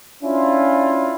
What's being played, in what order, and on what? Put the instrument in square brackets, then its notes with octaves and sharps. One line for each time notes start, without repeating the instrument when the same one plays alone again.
[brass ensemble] C#4 D4 E4 F4